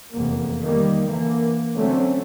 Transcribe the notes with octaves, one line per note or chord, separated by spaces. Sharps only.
F1 E2 A#3
D#3 G3 A#3
D3 E3 A#3
D3 F#3 A3 C4 C#4